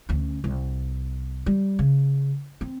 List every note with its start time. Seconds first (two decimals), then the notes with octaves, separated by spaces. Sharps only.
0.09 D2 C#4
0.44 C2
1.46 G3
1.79 C#3
2.61 C4